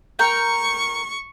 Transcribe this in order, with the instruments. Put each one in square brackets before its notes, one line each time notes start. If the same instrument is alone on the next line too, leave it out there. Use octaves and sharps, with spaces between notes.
[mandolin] A#4 G5 [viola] C#6